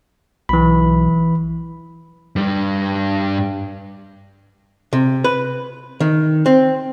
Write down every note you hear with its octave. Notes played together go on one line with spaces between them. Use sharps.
B1 E3 B5
G2 G3
C3
B4
D#3
C4